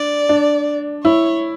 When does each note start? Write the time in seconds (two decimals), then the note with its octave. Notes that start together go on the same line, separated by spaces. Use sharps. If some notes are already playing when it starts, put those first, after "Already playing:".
Already playing: D4 D5
0.29 D4
1.04 E4 C#5